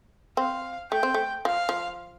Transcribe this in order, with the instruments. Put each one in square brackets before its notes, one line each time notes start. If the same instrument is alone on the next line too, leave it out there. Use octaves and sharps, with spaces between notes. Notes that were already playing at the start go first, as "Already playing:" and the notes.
[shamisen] C4 [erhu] F5
[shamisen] A3 [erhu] G5
[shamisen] C4
A3
[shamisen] F3 [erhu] F5
[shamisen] F3